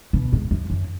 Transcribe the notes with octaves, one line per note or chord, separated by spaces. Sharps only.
B2
G#2
F#2
F#2